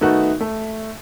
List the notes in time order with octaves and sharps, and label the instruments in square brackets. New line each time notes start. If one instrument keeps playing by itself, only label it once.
[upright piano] D#3 A3 B3 D#4 F#4
A3